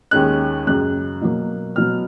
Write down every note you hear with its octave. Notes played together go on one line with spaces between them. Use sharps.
D#2 D#3 G#3 C#4 F#6
F#2 C#3 G#3 F#6
B2 F#3 A#3
B2 F#3 B3 F6